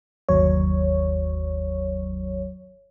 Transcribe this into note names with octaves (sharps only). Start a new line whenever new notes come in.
G1 D#2 F#3 C#5